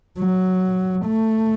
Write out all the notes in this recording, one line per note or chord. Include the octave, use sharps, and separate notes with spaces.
F#3
A3